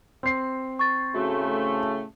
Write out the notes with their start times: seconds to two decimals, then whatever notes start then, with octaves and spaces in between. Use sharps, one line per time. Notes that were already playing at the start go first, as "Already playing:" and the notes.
0.23 C4 C7
0.79 C#6 A6
1.15 A2 C#3 A3 F#4